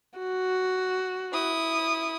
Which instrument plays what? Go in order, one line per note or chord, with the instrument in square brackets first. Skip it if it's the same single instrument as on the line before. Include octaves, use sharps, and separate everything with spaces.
[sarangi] F#4
[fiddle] E4 D#6